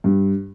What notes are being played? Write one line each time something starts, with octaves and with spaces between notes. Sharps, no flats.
G2